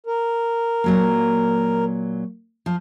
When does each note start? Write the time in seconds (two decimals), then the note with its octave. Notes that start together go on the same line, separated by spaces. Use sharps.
0.06 A#4
0.84 A#2 F#3 A#3
2.66 F3